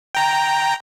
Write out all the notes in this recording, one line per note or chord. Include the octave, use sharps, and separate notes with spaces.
G5 A#5